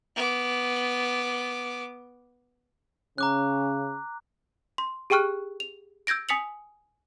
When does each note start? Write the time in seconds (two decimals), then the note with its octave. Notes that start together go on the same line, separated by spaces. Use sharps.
0.16 B3 D6
3.18 C#3 C#4 A#5 D6 F#6
4.78 C6
5.10 G4 G#4 G5 C#6 F6 F#6
5.60 F7
6.07 E6 G6 G#6 A#6 D7
6.29 G#5 D#6 B6 C#7 F7 F#7